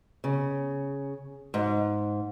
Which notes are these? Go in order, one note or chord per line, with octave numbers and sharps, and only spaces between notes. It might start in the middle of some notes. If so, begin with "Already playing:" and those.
C#3
G#2